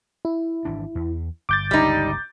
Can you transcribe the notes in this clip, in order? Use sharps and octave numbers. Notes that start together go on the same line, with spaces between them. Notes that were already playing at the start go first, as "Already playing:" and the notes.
E4
G#1 E3 D4
E2
G1 D6 G6 A6
G1 C#2 G3 D#4